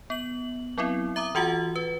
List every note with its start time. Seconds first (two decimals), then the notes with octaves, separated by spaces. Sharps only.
0.10 B3 F#7
0.78 F#3 B3 C4 E4
1.16 E5 A#5 D6 D#6
1.35 E3 F4 F#4 F#5 A6
1.76 B4